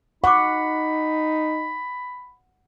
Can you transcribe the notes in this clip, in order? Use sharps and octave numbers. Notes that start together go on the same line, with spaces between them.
D#4 F#5 B5 C#6 D6